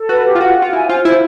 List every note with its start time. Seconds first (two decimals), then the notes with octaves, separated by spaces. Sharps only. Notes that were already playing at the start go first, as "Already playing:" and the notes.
Already playing: A4
0.09 F#4 B4
0.25 G4
0.35 F4
0.41 F#4 F#5
0.58 F4 F#5
0.73 E4 G#5
0.89 F4 C5
1.05 E4 C5